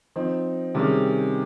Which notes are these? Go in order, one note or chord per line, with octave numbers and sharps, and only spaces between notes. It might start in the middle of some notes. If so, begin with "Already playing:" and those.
F3 C4 D#4
C3 D#3 G3 C#4 G#4